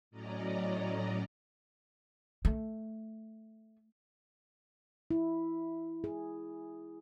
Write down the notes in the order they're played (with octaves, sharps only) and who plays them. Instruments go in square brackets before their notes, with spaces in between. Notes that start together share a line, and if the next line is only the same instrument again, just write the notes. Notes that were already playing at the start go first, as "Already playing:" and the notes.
[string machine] A2 F#3 C#4 D5 D#5 A#5
[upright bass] A3
[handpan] E4
G#4